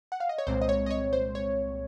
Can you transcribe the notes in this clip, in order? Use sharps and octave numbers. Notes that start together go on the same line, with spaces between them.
F#5
F5
D#5
C#5
C2 A#2 G#3 C4 C5
D#5
C#5
D#5
C#5
C5
C#5